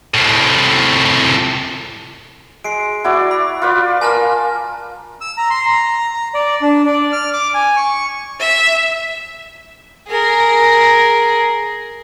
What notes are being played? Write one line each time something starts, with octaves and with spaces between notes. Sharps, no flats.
C2 A2
G#3 C7 D7
E4 F#4 D5
B5
F4 B4 D5
F4 A#4 G#5 A5 F6
E6
A#5
C6
A#5
A#5
D5
D4
D5
F6
D6
G#5
C#6
E5
G#4 A#4